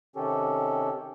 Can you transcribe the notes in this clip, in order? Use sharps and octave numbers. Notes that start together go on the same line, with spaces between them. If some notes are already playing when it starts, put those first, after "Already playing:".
C3 D#3 C#4 G4 A4